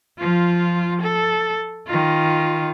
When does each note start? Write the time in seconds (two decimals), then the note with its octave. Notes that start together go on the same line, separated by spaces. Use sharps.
0.19 F3 F4
1.01 A4
1.87 D#3 F4